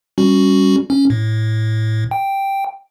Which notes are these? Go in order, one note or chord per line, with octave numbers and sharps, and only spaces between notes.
G3 C#4 F#4
C#4
A2
G5